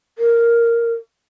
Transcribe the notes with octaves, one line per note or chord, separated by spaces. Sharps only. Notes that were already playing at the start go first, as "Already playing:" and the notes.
A#4